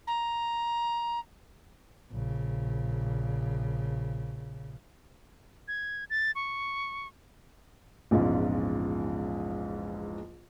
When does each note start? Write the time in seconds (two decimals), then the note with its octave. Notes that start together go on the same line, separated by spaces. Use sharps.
0.07 A#5
2.12 A#1 C#3
5.68 G#6
6.10 A6
6.35 C#6
8.11 A#1 E2 G#2 C#3 F3 G#3